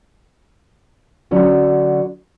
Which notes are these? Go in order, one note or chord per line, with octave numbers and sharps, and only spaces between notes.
D3 F#3 C#4 D4